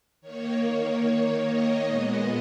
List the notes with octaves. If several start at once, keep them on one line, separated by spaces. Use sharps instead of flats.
D#3 A#3 C#5
C#5
C#5
D#5
A#2 G#3 B3 D#5